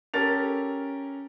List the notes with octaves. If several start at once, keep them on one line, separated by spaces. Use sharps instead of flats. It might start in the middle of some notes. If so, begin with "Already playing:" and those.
C#4 G4 A4 A#4 A6 F7